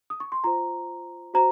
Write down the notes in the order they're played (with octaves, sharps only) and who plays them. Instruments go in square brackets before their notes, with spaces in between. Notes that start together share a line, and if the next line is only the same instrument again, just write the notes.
[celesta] D#6
C#6
C6
F4 C5 A#5
F#4 C5 A#5